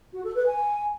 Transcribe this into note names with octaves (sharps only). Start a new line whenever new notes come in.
F#4
A4
B4
G#5